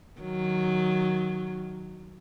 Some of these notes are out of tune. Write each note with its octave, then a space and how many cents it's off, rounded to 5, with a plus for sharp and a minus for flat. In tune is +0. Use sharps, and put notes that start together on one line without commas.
D#3 +0 F#3 +0